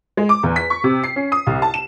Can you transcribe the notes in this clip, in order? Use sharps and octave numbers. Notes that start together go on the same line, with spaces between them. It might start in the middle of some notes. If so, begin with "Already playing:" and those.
G#3
D6
E2
B6
C#6
C3
C7
C#4
D#6
C2
A5
E7